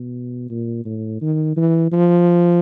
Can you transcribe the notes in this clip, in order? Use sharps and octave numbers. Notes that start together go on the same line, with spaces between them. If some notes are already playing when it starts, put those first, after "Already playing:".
Already playing: B2
A#2
A2
D#3
E3
F3